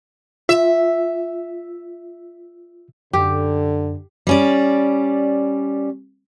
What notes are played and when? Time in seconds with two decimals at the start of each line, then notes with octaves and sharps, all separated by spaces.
0.49 F4 E5
3.13 F#2 D3 G4
4.27 G3 C#4 D5